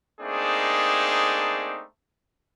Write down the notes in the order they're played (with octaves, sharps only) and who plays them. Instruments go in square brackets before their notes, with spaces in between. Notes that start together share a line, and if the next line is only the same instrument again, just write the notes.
[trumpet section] A3 A#3 C4 D4 D#4 G#4